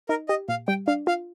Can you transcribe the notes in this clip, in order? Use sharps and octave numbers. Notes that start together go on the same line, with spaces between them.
D#4 A#4
G4 D#5
A#2 F5
G3 G5
D4 F5
F4 F5